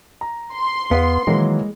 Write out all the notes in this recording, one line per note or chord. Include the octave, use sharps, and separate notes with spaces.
A#5
C6
E2 B3 F5
D#3 E3 F#3 G#3 A#3